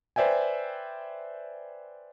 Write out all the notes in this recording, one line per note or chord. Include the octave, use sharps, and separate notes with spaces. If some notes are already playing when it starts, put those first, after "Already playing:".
B4 C5 D5 E5 G5 G#5